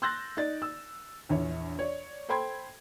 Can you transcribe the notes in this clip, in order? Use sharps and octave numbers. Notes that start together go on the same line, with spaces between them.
C6 E6 F#6 G6 A6 A#6
D#4 D5 A6
E6
A#1 E2 C#5
C#5 D5
A4 C5 G5 B5 C6 G#6